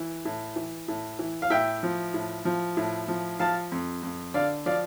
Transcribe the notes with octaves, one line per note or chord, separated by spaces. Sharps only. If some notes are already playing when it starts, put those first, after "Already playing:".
Already playing: E3
A2
E3
A2
E3
F5
A2 E5 G5
F3
A2
F3
A2
F3
F3 F5 A5
F2
F2
D3 D5 F5
F3 D5 F5